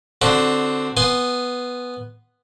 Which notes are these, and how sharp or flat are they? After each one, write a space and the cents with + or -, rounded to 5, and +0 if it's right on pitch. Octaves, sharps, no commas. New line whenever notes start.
D3 +0 C4 +0 F#4 +5
B3 +0 G#5 +0 C6 +0